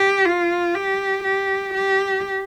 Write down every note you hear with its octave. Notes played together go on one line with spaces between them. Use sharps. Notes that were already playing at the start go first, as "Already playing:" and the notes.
Already playing: G4
F4
G4
G4
G4